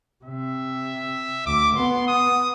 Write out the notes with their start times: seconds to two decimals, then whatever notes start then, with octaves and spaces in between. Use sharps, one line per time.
0.25 C3 E5
1.46 D2 D6
1.76 B3 C6
2.08 D#6